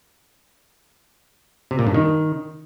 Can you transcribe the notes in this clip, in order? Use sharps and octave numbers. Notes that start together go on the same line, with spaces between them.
C3
A#2
G2
D#3